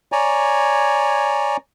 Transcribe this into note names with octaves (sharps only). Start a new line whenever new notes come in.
C#5 D5 G#5 A#5